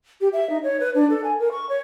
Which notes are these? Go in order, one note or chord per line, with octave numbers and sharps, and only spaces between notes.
G4
E5
D#4
C#5
B4
D4
A4
G#5
A#4
C#6
C#5